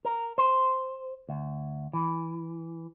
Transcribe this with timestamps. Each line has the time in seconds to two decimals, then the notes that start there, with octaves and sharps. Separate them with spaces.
0.05 A#4
0.38 C5
1.29 D2
1.93 E3